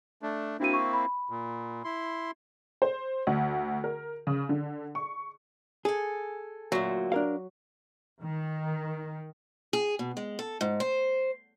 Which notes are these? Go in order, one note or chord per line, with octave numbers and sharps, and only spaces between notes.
A3 D4
A#3 C4 D4 E4 F#4 D#7
C#6
B5
A#2
E4 C6
C5
D2
A#4
C#3
D3
C#6
G#4 A4 G#5
D2 A#2 F#3
D4 A#4 F5
D#3
G#4
B2
G#3
A4
G#2
C5